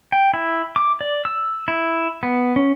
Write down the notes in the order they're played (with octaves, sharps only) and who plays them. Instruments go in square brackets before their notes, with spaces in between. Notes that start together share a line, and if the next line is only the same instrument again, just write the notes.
[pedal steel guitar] G5
E4
D6
D5
E6
E4
B3
C#4